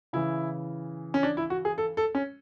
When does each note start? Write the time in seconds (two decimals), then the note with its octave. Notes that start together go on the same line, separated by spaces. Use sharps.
0.13 C#3 E3 E4
1.14 C#4
1.23 D4
1.37 E4
1.50 F#4
1.65 G#4
1.78 A4
1.97 A4
2.15 C#4